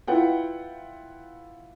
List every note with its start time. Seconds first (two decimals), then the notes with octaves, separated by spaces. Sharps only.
0.07 E4 F4 B4 F#5 G5